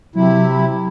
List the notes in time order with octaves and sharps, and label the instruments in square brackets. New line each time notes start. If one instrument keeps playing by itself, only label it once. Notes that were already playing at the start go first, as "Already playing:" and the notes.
[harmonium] C3 E4 [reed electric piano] F#3